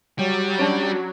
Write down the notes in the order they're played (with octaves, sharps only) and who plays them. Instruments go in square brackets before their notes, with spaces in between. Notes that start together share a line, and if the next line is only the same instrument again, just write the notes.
[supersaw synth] F#3 [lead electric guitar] G3
[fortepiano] C#4 D4